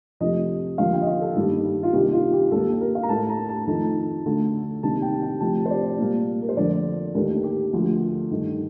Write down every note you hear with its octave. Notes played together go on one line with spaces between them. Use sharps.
F2 C3 F3 A3 D#5
D#2 D3 F3 A#3 F5
G5
D#5
F5
A4
G2 D#3 G3 A#3
F4
C2 C3 D#3 A#3 G4
F4
G4
D#2 D#3 A#3 A4
A4
A#4
F5
A#5
A2 A3 A5
A#5
A5
F2 D#3 A3
D2 D3 A3
C2 C3 D#3 A#3 A5
G5
G5
D2 C3 F3 A5
C5
D5
A#2 G3 A#3
A#4
C5
F2 D3 F3 A3 D5
D#2 D#3 A3 A#4
G4
D2 D3 F3
G2 D#3 A3